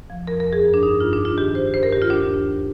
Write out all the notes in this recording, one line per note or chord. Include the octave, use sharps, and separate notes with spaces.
F3
F2 A#4
A#4
F2
G#4
G2
D4
G2 D#4
G2 F4
D4
G2
F4
D#3 G4
D#3 C5
G2 C5
A#4
D#3 G4
F4
D#2 D4